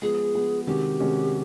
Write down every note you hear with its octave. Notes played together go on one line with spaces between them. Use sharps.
F3 G#3 B3 G#4
F3 G#3 B3
C3 D#3 G#3 C#4 F#4 G4
C3 D#3 G#3 C#4 F#4